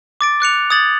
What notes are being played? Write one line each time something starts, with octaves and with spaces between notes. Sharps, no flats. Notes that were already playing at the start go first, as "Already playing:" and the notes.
D6 A6 D7
D6 F#6 C#7 F7
D#6 G#6 A6 F#7